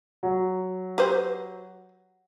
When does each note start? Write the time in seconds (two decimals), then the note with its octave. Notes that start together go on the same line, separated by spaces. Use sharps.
0.23 F#3
0.98 G4 B4 C5